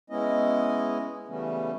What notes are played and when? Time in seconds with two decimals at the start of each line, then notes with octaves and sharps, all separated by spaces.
0.10 G#3 B3 C#4 E4 D#5
1.28 C#3 E3 G3 A3 B3 C#4